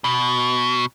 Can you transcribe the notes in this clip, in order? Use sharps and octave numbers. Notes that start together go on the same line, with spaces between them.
B2